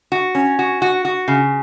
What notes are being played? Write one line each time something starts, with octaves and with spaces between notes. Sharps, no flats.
F#4
C#4
F#4
F#4
F#4
C#3